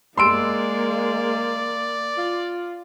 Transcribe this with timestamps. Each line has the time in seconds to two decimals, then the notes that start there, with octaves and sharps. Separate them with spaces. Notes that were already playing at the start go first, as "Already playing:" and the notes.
0.17 G#3 A#3 D5 C6 E6 D7
2.17 F4